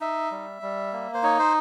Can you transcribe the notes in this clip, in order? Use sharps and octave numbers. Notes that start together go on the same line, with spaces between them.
D#4 E5
G3
G3
A#3
C5
D#4 C#5
C5